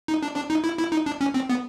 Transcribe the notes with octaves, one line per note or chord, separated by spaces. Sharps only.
D#4
D4
D4
D#4
E4
E4
D#4
D4
C#4
C4
B3